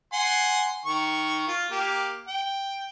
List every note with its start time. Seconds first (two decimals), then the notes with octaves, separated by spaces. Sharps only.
0.13 F#5 G#5 C6
0.85 D#3 C#6
1.47 F4
1.71 A#3 G4
2.28 G5